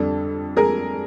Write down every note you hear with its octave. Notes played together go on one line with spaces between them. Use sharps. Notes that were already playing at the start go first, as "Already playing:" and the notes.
Already playing: F2 D3 G3 A4
G#4 A#4